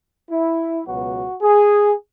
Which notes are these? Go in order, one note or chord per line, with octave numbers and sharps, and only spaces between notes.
E4
C#2 B2 F#3 B3 F#4
G#4